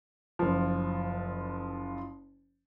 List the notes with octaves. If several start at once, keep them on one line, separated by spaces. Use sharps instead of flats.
F#1 F3